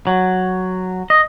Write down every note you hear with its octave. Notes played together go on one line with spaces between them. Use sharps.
F#3
D#5